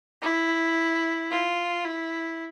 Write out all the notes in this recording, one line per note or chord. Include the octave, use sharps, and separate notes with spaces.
E4
F4
E4